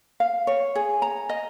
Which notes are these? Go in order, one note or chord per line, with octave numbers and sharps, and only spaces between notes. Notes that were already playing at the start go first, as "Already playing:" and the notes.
F5
C#5
G#4
A#5
D#5